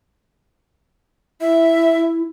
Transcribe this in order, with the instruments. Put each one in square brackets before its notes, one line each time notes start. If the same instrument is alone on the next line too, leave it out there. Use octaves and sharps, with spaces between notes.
[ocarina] E4 [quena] E5